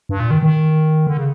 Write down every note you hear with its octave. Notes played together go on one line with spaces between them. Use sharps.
G2
A#2
D#3
D#3
D3
C#3